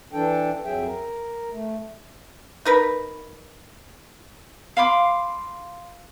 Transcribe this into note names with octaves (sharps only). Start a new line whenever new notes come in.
E3 D4 A4 G5
F2 F#3 G#4 E5 G5
A#4
A3
D#4 A#4 B4
F5 B5 C6 D6